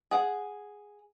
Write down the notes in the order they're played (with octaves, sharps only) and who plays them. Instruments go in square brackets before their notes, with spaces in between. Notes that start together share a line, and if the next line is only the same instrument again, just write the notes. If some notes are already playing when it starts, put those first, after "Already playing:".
[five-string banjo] G#4 F#5